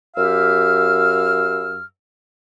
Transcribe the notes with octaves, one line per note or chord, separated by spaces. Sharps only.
F#2 G4 F5 E6 F6